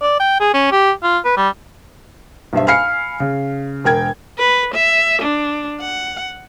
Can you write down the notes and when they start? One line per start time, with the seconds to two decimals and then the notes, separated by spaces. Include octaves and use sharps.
0.02 D5
0.19 G5
0.40 G#4
0.54 C#4
0.71 G4
1.03 F4
1.24 B4
1.37 G3
2.53 B1 G2 C5 E5
2.67 F5 G#5 B5 F6 C7 C#7
3.20 C#3
3.84 E1 A#4 G5 G#6
4.39 B4
4.74 E5
5.22 D4
5.80 F#5